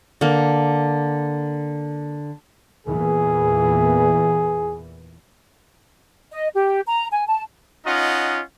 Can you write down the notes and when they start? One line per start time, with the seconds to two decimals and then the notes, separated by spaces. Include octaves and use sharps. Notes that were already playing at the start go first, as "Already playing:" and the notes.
0.21 D3 A#3
2.87 E2 A#2 E3 G#4
6.32 D#5
6.55 G4
6.87 A#5
7.12 G#5
7.28 A5
7.86 C#4 D#4 F4 D#5 F#5